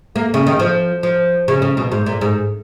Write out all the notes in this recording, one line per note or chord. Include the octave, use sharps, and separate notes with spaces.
A#3
C#3
D#3
F3
F3
C#3
C#3
B2
G#2
A#2
G#2